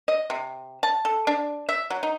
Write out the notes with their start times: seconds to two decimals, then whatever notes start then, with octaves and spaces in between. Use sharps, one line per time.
0.08 D#5
0.30 C3
0.83 A5
1.05 A4
1.27 D4
1.69 E5
1.90 F#3
2.03 D#4